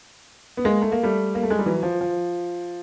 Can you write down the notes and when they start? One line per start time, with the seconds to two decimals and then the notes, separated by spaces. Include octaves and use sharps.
0.57 B3
0.64 G#3 A#3
0.82 A3
0.92 A#3
1.03 G3 A3
1.35 A#3
1.43 A3
1.50 G#3
1.59 G3
1.66 E3 F#3
1.83 F3
2.01 F3